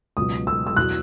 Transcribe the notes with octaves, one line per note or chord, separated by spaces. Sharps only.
C#2 B2 F#3 D#6
E6
E6
E2 B2 F#3 F#6